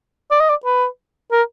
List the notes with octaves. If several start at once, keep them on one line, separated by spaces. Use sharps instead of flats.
D5
D#5
D5
B4
A#4